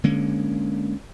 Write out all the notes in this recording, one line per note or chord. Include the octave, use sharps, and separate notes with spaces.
D3 G#3 A#3 C#4